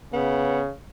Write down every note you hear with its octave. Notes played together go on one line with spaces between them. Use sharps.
C#3 B3